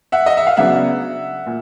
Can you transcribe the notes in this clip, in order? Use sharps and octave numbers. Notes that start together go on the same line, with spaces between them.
E5 F#5
D#5
E5
F5
C#3 F#3 B3 D4 E5 F#5
A#2